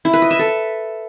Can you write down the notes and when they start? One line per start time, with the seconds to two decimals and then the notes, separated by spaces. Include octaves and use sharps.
0.05 E4
0.13 B4
0.22 D#5
0.31 E5
0.39 A4